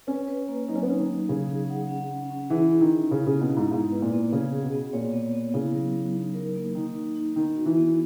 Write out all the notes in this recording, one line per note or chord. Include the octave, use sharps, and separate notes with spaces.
C#4 B4
B4
A#3
F#3 D#4
C#4
B3
C#4 D#4
D#3
F#3
C#3 G#4
G#4
F#5
C#4
C#4
C#4
E3 G#4
E4
D#3
E4
C#3 E4
C#3 B3
B2
G#2 E4
G#2 B3
B4
A#2
B3
C#3 G#4
G#4
B2
B3
A#2 C#5
B3
B3
C#3 E4
F#3
F#3
D#4
A#4
A#3
D#3 D#4
D#4
D#4
D#3 B3
F#4
E3
B3